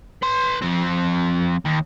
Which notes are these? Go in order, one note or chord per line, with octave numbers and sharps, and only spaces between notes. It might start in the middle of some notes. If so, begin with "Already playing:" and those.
B4 C6
F3 C4
D#2